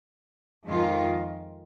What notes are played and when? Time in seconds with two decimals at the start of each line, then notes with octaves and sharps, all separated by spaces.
0.67 F2 D#3 G#3 F4